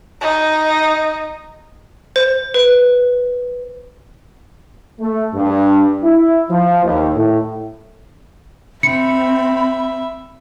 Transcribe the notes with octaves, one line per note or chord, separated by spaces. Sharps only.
D#4
C5
B4
A3
G2
E4
F3
D#2
A2
C4 E5 B5 C#7